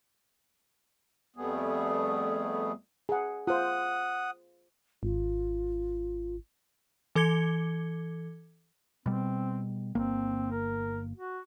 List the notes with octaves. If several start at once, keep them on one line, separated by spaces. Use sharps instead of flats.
F2 G3 A3 B3 G#4
G#4 F#5
F4 C5 F#5 D#6
G#1 F4
E3 A4 D6 G#6 C#7 G7
B2 G3 C4
G1 A#3 C4
A#4
F#4